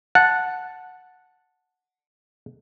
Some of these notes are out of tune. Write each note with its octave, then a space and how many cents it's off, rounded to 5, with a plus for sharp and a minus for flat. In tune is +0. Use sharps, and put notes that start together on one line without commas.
F#5 -10 A5 +0